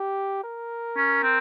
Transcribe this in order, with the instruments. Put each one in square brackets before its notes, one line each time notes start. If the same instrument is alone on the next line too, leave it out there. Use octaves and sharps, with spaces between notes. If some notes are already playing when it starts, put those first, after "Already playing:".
Already playing: [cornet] G4
A#4
[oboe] C#4
C4